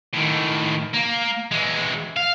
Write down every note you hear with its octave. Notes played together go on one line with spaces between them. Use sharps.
A2 D#3
A#3
E3 G#3
F5